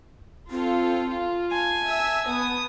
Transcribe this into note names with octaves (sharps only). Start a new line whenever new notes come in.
C4 F4 A4
F4
G#5 A5
E5 E6
B3 D#6